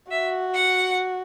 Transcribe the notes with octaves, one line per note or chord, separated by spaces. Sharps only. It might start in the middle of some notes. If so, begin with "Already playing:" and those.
F#4 E5
F#5